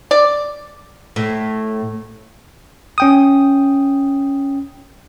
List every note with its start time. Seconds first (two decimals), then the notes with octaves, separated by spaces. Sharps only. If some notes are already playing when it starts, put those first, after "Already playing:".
0.11 D5
1.16 A2
2.98 C#4 G5 D#6